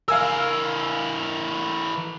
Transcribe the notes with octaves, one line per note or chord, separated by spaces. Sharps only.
E3 A#4 F5 G#5 E6